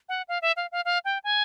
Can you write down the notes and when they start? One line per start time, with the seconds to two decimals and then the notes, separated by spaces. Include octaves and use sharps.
0.09 F#5
0.28 F5
0.42 E5
0.56 F5
0.72 F5
0.85 F5
1.05 G5
1.24 G#5